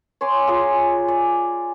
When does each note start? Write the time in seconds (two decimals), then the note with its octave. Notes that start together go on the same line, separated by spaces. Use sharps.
0.21 C#5 G#5 C6 D6
0.47 F4 G#4 G#5 A#5
1.08 D5